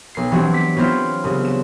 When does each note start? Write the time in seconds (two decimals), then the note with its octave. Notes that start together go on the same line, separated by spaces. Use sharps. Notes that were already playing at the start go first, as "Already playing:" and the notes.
0.15 B1 C7
0.31 E3 F#3 G3 C4 D4 F#4
0.53 D6 B6
0.76 F#3 B3 C4 E4 F4
1.24 C2 C#3
1.45 E7